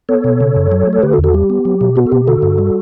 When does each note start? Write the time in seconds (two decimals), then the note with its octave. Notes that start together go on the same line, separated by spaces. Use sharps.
0.09 B3 A4 C#5
0.24 B2
0.40 C#3
0.56 F#2
0.72 F#3
0.87 A3
0.93 A4
1.02 D3 G4 B4
1.13 F#4 A4
1.18 E2
1.24 F#4 A4
1.34 G3 G4
1.50 B3
1.65 F#3
1.81 B2
1.96 B3 F#4
2.07 A4
2.12 B2 G4
2.27 D3 F#4 A4
2.42 G2
2.58 G3